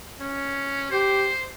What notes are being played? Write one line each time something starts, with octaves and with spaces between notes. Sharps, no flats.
C#4
G4 C5